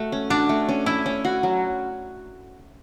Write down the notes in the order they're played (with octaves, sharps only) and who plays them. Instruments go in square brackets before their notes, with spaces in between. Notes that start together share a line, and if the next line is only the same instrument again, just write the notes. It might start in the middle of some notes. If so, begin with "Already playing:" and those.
Already playing: [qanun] A3 F#4
C#4
[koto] D4 [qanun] F#4
[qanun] A3
C#4
[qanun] C#4 [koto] E4
[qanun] C#4
F#4
F#3